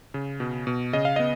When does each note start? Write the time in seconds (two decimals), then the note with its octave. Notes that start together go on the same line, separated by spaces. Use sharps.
0.14 C#3
0.40 B2
0.67 B2
0.93 C#3 D#5
1.05 F5
1.16 B3 D#5